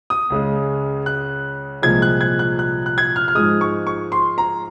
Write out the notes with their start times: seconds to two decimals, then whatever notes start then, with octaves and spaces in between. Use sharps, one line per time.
0.10 D#6
0.30 C#2 C#3 G#3
1.06 F#6
1.82 C2 A#2 F3 G#3 G#6
2.02 F#6
2.21 G#6
2.39 F#6
2.59 F#6
2.86 F#6
2.98 G#6
3.16 F6
3.28 F6
3.35 G#2 F3 G#3 D#6
3.61 C#6
3.87 C#6
4.12 C6
4.38 A#5